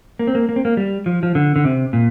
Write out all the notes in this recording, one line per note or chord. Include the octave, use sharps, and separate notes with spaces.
A#3
C4
A#3
A#3
C4
A#3
G3
F3
F3
D3
D3
C3
A#2